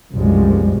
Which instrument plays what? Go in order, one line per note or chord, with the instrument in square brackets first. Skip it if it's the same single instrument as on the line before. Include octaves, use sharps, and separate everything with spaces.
[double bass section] C2 F#2 B2 F3 G3 G#3